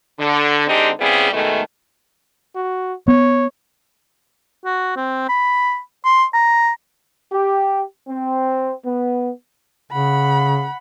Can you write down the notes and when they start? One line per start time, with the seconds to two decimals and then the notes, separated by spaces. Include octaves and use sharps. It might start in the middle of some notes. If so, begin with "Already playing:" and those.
0.19 D3
0.68 D3 G#3 C4 D4 D#4 G4
0.98 C#3 G3 B3 C4 E4 G#4
1.32 B2 D#3 G#3 A3
2.56 F#4
3.08 B3 C#5
4.65 F#4
4.96 C4
5.29 B5
6.05 C6
6.34 A#5
7.31 G4
8.07 C4
8.85 B3
9.92 C#3 F#5 B5